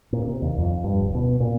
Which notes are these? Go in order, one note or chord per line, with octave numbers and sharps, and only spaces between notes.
A#2
C3
D#2
F2
G2
D1
B2
A#2